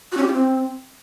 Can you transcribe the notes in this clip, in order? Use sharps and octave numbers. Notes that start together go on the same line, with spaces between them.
F#4
C#4
G4
F4
C4